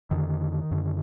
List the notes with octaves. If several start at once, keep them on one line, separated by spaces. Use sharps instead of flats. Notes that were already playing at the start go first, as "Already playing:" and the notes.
F2 D3 D#3
F#2 D3